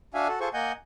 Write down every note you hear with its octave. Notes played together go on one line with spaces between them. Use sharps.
D4 F#4 E5 F5 G#5
F#4 A4
F4 G#4 A4 C5 C#6
A#3 D#5 F#5 G#5 G6